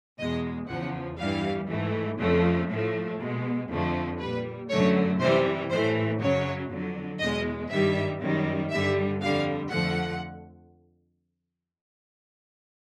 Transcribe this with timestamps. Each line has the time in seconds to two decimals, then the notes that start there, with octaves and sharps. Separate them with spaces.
0.18 E2 B2 G#3 D#5
0.68 E2 C#3 F3 F#5
1.18 G2 E3 G3 F5
1.68 G#2 E3 A3
2.19 F2 C#3 F3 A3
2.69 A2 F3 A3
3.20 B2 G#3
3.69 F2 D3 F3 A3
4.20 A#2 G3 B4
4.69 F#2 D3 F#3 A3 C#5
5.20 C3 E3 G3 C5
5.70 A2 E3 A3 C5
6.20 F#2 C#3 F#3 C#5
6.70 F2 D3 F#3
7.20 E2 B2 G#3 D#5
7.70 G2 D#3 G3 E5
8.21 F#2 D#3 G3
8.70 G2 D3 G3 E5
9.21 F2 D3 G3 F5
9.71 F2 D3 F3 A3 F#5